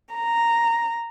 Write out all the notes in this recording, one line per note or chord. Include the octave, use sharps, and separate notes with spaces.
A#5